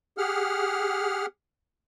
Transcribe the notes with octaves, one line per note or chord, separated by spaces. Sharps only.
G4 G#4 F#5 F6